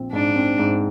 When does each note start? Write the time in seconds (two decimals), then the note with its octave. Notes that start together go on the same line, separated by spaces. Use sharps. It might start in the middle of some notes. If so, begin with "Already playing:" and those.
Already playing: A#1 C4
0.13 G#2 D4
0.36 C4
0.59 G#2